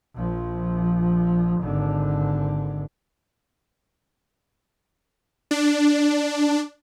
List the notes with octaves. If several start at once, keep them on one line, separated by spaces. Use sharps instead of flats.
A#1 F3
G#1 D3
D4